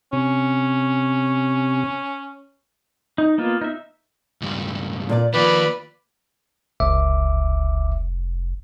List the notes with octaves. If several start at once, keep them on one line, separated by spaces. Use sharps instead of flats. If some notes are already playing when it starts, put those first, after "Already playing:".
C3 C#4
D#4
A#3 B3 F4
D#4 E5
C#2 G2
A#2 A#4 D5
D#3 F3 A#3 B4 D5 B5
F1 C#2 E5 D6